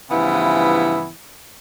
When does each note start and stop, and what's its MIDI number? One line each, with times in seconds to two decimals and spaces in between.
0.10 1.08 43
0.10 1.08 49
0.10 1.08 52
0.10 1.08 53
0.10 1.08 59
0.10 1.08 64